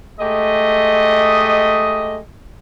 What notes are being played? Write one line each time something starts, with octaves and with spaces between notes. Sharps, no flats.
G#3 A3 G4 D#5